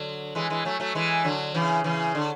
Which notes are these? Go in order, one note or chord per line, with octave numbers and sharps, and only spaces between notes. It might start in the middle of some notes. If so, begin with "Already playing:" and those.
Already playing: D3 F#3
E3 G#3
E3 G#3
F#3 A3
F#3 A3
E3 G#3
D3 F#3
C#3 E3
C#3 E3
D3